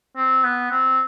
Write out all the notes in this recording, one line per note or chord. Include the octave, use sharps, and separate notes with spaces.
C4
B3
C4